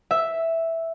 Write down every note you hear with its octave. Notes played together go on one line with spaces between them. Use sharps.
E5